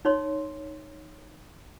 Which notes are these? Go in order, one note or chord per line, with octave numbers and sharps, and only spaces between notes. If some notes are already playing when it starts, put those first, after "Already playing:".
D#4 C#5 C6